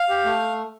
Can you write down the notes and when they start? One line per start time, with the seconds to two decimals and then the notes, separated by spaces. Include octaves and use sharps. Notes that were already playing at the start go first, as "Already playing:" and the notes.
Already playing: F5
0.09 G4
0.25 A3